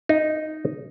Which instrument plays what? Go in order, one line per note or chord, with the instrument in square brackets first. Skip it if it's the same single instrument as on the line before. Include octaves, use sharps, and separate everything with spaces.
[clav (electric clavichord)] D#4